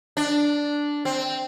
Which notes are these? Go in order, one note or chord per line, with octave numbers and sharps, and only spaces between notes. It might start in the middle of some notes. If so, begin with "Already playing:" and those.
D4
C4